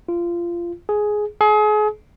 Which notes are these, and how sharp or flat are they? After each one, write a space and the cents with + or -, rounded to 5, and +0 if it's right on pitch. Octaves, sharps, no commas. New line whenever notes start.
F4 -20
G#4 +10
G#4 +35